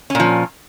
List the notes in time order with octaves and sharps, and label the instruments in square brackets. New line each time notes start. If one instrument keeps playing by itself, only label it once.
[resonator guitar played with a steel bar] C#4
A#2
F3